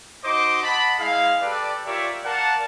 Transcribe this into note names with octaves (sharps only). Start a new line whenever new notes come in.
D#4 F#4 C5 D#5 D6
D#5 F#5 A5 B5
G#3 E4 G#4 F5
G4 A4 B4 D5
F4 G4 A#4 C#5 D5 E5
A#4 D5 F5 F#5 A5